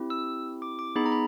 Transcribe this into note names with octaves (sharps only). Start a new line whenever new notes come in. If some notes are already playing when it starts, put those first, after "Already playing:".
Already playing: C4 E4 G4
E6
D6
D6
B3 D#4 G#4 B5
A#5
B5